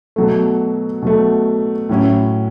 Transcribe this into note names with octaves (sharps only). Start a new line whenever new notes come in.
B2 F#3 A3
B2 F#3 A3
A2 F#3 C#4 E4